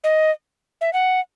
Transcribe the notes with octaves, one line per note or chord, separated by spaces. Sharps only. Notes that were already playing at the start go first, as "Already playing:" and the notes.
D#5
E5
F#5